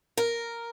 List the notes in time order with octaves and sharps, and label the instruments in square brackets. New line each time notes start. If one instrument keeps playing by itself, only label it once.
[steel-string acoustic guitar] A#4